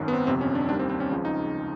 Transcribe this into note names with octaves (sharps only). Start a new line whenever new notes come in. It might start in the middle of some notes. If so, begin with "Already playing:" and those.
Already playing: G#1 F#2 D#3 F#3
B3
C4
G1 F2 C3 C4
C#4
D4
D#2 D#3 G3 D4
C4
C4
C#4
C#2 C#3 F3
D#4